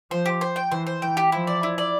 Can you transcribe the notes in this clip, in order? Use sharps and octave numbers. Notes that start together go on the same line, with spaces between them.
F3 C5
G4
C5
G5
E3 C5
C5
E3 G5
G4
F3 E4
D5
E4
D5